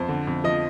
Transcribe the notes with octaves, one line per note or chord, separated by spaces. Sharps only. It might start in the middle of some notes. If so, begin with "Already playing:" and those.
Already playing: F2 C5
D3
F2
F3 D#5